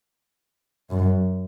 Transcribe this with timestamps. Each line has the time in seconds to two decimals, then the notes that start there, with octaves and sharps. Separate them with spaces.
0.90 F#2